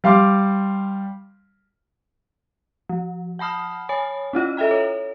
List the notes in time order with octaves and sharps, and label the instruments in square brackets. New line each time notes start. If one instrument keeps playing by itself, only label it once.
[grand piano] G3 F5 C6 D6
[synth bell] F3
F#5 A5 B5 D#6 F6
C#5 G#5 B5
C#4 E4 F4 D#5
A4 D#5 E5 G5 A#5
C#5